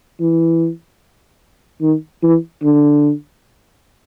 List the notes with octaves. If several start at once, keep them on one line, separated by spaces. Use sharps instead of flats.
E3
D#3
E3
D3